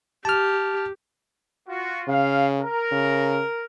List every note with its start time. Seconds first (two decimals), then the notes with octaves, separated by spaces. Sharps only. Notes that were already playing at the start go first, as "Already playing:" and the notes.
0.25 G4 A5 F6
1.68 F4 F#4
2.08 C#3 F5
2.61 A#4
2.92 C#3